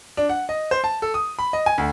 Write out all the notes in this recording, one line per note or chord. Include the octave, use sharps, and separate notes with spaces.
D4
F#5
D#5
C5
A5
A4
D#6
B5
D#5
G#5
D2